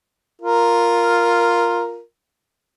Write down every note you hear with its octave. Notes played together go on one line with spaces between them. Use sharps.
F4 A#4